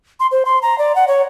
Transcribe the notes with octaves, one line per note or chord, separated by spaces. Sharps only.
C6
C5
C6
A#5
D5
F#5
C#5